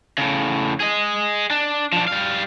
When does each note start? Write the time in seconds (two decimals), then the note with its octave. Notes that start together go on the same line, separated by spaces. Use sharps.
0.18 A2 C#3
0.80 G#4 D#5
1.51 D4
1.93 F3 D4
2.08 G3 F5